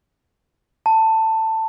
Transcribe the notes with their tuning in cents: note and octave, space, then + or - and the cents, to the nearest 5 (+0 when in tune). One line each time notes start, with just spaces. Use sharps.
A5 +15